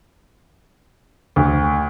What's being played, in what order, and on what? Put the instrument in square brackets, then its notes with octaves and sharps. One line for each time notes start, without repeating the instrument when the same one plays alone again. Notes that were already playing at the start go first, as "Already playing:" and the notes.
[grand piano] D2